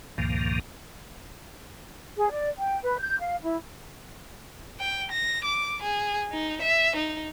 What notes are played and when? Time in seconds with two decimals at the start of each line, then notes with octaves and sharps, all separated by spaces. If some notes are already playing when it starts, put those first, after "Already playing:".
0.18 C#2 G2 A#2 D#3 F3 A#3
2.17 G#4
2.30 D5
2.59 G5
2.83 B4
3.00 G6
3.19 F5
3.43 E4
4.80 G5
5.12 A#6
5.44 D6
5.82 G#4
6.32 D#4
6.62 E5
6.96 D#4